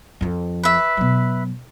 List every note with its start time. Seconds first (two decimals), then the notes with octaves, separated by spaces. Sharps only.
0.21 F2 F3
0.63 B4 E5
0.97 B2 F#3